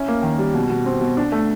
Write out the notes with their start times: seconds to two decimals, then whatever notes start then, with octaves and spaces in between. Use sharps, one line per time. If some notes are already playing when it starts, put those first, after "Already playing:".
Already playing: C#4 E4
0.08 A#3
0.23 D#3
0.39 G3
0.54 B2
0.70 B2
0.86 C4
1.01 B2
1.17 D4
1.32 A3